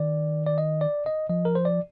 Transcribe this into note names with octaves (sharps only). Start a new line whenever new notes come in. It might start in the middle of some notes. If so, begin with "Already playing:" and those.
Already playing: D#3 D5
D5
D#5
D5
D#5
F3 D#5
A#4
C5
D5